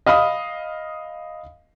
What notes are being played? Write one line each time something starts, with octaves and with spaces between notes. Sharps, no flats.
D#5 F5 B5 D#6